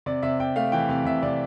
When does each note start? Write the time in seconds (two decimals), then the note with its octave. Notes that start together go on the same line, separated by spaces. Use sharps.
0.06 C3 D5
0.23 C3 E5
0.40 C3 G5
0.56 A3 F5
0.72 E3 G5
0.89 C3 F5
1.05 C3 E5
1.22 C3 D5